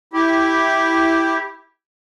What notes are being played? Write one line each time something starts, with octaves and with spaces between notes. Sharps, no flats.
E4 G4